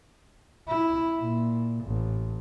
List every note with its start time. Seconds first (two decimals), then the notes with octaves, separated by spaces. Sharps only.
0.69 E4
1.21 A#2
1.86 A1